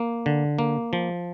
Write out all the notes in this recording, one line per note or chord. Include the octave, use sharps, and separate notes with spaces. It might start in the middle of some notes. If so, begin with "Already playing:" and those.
Already playing: A#3
D3
A#3
F3